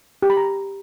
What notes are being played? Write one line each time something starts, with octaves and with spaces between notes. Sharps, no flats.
G4
B5
A#5